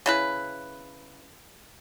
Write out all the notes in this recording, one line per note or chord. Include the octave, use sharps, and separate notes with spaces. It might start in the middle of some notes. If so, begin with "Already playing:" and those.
C#3 E4 B4